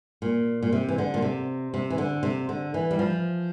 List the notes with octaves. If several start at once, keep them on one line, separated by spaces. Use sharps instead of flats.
A#2
A#2
C3
E3
D3
A#2
C3
C3
E3
D3
C3
D3
E3
G3
F3